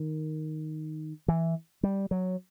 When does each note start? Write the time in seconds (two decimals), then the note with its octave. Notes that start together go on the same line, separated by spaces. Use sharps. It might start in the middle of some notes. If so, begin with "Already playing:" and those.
Already playing: D#3
1.28 E3
1.83 G3
2.11 F#3